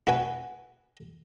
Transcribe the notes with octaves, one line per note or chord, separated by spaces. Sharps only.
E4 F#4 B4 G#5